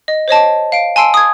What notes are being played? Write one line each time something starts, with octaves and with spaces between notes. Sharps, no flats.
D#5
C5 C#5 D#5 A5
F5 D7
G#5 A5 C6 E6 C7 D7
D#6 G#6